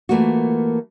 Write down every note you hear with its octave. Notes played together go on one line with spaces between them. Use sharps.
E3 A3 A#3 F4 F#4